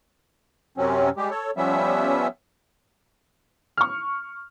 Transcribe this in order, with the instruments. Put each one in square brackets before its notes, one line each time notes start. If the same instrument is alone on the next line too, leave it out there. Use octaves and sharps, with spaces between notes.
[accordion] F#2 C3 F#3 C4 C#4
G3 G#3 G4
A4 C#5
F3 G3 B3 C#4 E5
[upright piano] C#6 F6